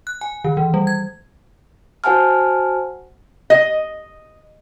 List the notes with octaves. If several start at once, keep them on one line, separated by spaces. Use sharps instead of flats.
F#6
G#5
D#3
E3
G3
G#6
F#4 C5 F#5 G#5 A5 F6
D#5